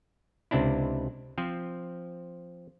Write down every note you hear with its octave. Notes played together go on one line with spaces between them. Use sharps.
C#2 C3 C4 D4 E4
F3 C4